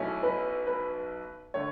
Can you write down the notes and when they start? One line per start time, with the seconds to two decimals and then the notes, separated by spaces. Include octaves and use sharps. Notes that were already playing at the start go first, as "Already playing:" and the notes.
Already playing: B1 B2 A3 C#4 E4
0.23 B4
0.67 B4
1.54 D3 A3 C#5